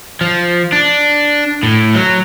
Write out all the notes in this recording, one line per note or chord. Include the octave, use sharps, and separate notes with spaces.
F3
D4
A2
F#3